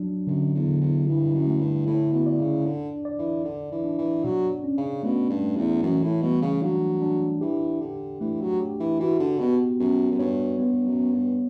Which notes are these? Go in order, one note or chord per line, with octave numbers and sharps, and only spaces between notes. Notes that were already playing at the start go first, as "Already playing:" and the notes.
Already playing: F#3 D4
F#2 D3
E2
D3
E2
G2 E4
F#2
A3
G2
A2 E4
B2
D5
C#3
D3 D4
D5
E3
D3 D5
E3
D4
E3
B2 F#3
C#4
C#3
B2 A3
G2
A3
E2
F#2 E3
A2
B2 G3
C#3
F#3 D4
D4
E3 G4
D3 G4
E3 A3
F#3
G4
E3
E3 F#4
D3
B2 B3
F#2 B3
F#2
G2 C#5
G2 B3
F#2
B3
G2